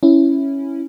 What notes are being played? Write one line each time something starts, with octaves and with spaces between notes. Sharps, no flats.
C#4 E4